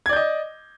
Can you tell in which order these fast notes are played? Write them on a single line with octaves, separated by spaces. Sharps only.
G#6 D5 G6 D#5